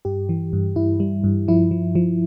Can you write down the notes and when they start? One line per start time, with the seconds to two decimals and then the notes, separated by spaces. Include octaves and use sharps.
0.05 G2 G4
0.29 E3
0.53 G2
0.76 G2 E4
1.00 G3
1.24 G2
1.48 F3 E4
1.71 F3
1.95 F3